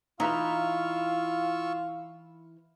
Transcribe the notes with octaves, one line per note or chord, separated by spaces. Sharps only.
E3 D#4 F4 B4 F5 A#5 C#6 E6